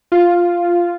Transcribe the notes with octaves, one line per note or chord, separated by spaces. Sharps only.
F4